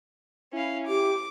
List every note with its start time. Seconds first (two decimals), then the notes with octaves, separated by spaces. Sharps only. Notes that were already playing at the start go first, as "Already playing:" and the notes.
0.53 C#4 E4 F5
0.88 G4 D6